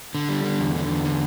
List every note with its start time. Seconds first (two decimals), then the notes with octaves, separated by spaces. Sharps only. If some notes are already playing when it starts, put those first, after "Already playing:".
0.15 D3
0.29 G3
0.44 D3
0.59 E2
0.75 D3
0.89 E2
1.05 D3